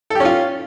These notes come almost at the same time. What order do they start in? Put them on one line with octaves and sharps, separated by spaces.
A4 G4 C#4 F4